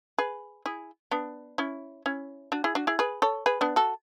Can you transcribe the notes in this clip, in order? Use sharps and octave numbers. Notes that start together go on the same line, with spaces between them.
G#4 B4
E4 G#4
B3 D4
C#4 E4
C#4 E4
D4 F#4
E4 G#4
D4 F#4
E4 G#4
G#4 B4
A4 C#5
G#4 B4
B3 D4
F#4 A4